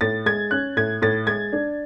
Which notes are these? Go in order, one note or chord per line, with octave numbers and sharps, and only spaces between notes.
A2 A6
G#3 G#6
C#4 F#6
A2 G#6
A2 A6
G#3 G#6
D4